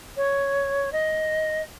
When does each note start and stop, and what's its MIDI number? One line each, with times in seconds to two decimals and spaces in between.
0.17 0.92 73
0.92 1.62 75